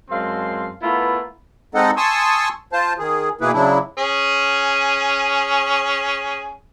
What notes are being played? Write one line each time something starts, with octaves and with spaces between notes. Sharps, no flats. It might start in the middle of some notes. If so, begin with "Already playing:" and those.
F#2 G#3 C4 F5 A5 C6
A3 B3 E4 F4 A#4 B4
G#3 C4 D#4 A4 D#5 F#5
G#5 A5 C6 C#6 D#6 E6
F4 C5 A5
D#3 G#4
B2 E3 A#3 E4 G#4 B4
C#3 F#3 D4 E4
C#4 G#4